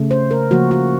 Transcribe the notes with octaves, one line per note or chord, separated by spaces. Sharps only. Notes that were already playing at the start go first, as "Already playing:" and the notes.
Already playing: C#3 A3
C5
A#4
C#3 F3 A#3 F#4
F#4